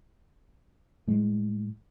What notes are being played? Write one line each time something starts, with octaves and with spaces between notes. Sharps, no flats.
A2 G3 G#3